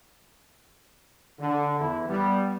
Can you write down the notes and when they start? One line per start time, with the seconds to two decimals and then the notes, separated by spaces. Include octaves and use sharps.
1.40 D3
1.80 E2 E4
2.08 G3 B3